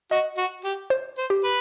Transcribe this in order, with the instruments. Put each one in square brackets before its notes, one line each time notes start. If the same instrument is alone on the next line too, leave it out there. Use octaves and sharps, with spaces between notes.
[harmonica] F#4 [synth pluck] D#5
[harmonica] F#4
G4
[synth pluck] C5
[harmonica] C5
[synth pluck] G4
[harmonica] B4